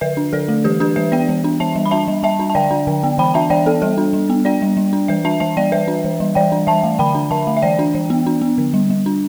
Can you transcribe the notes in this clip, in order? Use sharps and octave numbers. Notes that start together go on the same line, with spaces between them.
D3 B4 E5
D4
D3 A4 D5
A3
E3 G4 B4
D4 G4 B4
E3 B4 E5
B3 D5 G5
E3
D4
E3 E5 A5
G3
B5
D4 E5 A5
G3
G3 E5 A5
D4
A5
D3 D5 G5
D4
D3
B3
E3 G5 B5
D4 E5 A5
E3 D5 G5
B3 A4
G3 A4
D4
G3
B3
D4 D5 G5
G3
G3
D4
E3 B4 E5
D4 E5 A5
E3 E5 A5
G3 D5 G5
E3 B4 E5
D4
E3
G3
E3 D5 G5
D4
E3 E5 A5
A3
D3 G5 B5
D4
D3 E5 A5
A3
E5
E3 D5 G5
D4
E3
B3
D4
B3
D3
G3
G3
D4